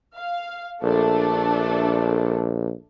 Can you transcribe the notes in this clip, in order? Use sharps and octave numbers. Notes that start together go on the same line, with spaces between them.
F5
A#1 A3 D4 A4